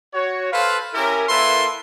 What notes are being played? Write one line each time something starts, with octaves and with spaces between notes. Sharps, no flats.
F#4 C#5
A4 B4 C5 F5
C#4 E4 G4 A#4
A#3 E4 A4 B4 E5 C6